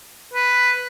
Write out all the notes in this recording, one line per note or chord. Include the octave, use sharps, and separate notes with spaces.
B4